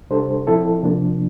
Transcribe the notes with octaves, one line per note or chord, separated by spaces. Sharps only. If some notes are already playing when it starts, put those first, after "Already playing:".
C3 G3 D4 A4 C5
A#2 F3 C4 E4 A4
C3 F3 A#3 D4